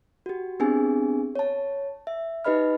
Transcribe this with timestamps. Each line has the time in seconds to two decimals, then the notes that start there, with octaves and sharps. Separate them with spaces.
0.26 F#4 G4
0.60 B3 C4 D4 G4 G#4 G#5
1.35 C#5 A5
2.07 E5
2.45 D#4 G4 B4 D#5 B5 F6